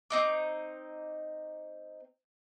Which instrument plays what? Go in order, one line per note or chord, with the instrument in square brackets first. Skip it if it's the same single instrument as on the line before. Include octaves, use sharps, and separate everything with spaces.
[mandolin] C4 D#4 D6